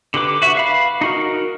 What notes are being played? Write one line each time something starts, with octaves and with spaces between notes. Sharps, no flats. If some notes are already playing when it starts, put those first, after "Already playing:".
D3 G4 B4 D6
F#4 E5
B4 F5 B5
D#4 F#4 A#4